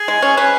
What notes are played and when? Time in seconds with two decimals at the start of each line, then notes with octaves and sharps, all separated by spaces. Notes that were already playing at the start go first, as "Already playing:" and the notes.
Already playing: G#4
0.08 G#3
0.22 C#4
0.37 C#4 B4